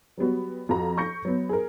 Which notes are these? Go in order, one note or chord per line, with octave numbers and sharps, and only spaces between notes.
F#3 G3 B3 F#4
F2 F3 F#4 A#5
C#6 G6 A#6 C#7
F#3 B3
G#4 A#4